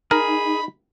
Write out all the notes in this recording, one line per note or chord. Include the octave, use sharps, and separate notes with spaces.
D#4 G#4 A#4 B5